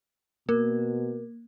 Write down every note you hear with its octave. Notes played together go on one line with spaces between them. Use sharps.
B2 A#3 A#4